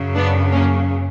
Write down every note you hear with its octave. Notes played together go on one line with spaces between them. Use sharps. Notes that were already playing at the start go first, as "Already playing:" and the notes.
Already playing: F#2 C#3 F#3
B3 D4
A#3 C#4